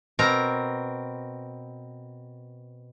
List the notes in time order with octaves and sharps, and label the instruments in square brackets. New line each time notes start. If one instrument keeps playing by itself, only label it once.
[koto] B2 C4 A#4 A#5